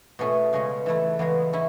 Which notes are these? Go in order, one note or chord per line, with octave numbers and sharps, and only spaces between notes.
B2 A3 C#4 G#4
C#3 G#3 C#4
E3 A3 E4
E2 C#3 G#3 B3
C#4 E4